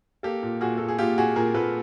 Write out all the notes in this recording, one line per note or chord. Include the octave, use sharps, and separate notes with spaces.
A#3 G4 A4
A#2
A#2 F#4 G#4
A#2 A4
G#4
A#2 F4 G4
A#2 F#4 G#4
A#2 G#4 A#4
A#2 A4 B4